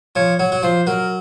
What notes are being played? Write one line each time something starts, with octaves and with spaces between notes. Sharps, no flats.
F3 C#5
F#3 C#5
F#3
F3 C5
F#3 A#4